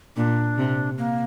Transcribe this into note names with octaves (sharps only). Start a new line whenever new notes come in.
A#2 D4
C3
A#3